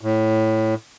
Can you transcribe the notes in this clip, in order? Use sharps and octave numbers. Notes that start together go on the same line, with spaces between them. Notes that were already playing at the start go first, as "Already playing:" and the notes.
A2